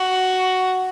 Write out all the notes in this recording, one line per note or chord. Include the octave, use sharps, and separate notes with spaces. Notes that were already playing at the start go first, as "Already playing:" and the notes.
Already playing: F#4